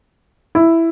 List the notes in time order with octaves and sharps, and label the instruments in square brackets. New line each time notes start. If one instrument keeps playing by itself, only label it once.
[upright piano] E4